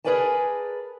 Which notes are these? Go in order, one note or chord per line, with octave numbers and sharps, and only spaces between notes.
G#4 A#4 B4 D5 G#5 A5